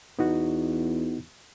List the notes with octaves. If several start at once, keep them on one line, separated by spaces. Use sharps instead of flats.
E2 B3 D#4 F#4